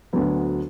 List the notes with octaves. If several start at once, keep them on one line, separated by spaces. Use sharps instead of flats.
D2 D3 F#3 B3